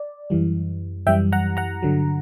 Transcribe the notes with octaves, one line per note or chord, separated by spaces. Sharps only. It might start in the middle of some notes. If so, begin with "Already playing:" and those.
Already playing: D5
F#2 E3 G3
F#2 E3 G3 E5 G5
F#5 A#5
F#5 A#5
G2 D3 F#3